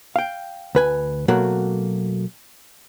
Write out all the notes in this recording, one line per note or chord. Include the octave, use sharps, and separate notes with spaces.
F5 G5
D2 B4 G#5
B2 F#3 A3 A#3 F#4